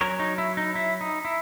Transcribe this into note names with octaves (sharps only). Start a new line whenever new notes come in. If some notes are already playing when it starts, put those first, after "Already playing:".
F#3 C#4 A#4 C#5
D#4
E4
D#4
E4
D#4
E4